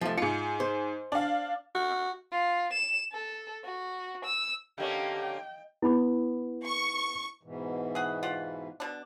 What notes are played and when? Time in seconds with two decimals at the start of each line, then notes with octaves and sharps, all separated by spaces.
0.01 F3 A3
0.18 G#2 F4 C#7
0.60 C5
1.12 D4 F5
1.75 F#4
2.32 F4
2.72 E7
3.12 A4
3.65 F#4
4.25 E6
4.78 D3 A#3 C#4 G4 D#5 F5 G5
5.82 B3 E4 B5 D6
6.66 C#6
7.43 G#2 B2 E3
7.95 G#4 F#5
8.23 F4 G4 F#5
8.80 B2 D4